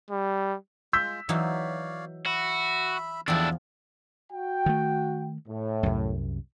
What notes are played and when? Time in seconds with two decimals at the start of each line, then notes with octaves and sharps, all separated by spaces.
0.10 G3
0.93 G#3 F4 E6 G6 B6
1.29 E3 F#3 D#4 C#5 D5 F5
2.26 F#4 E5 B5
3.28 E2 F3 D4 E4 A4 G5 A5
4.33 F#4 G5
4.66 D#3 A3
5.49 A2
5.83 C2 F#2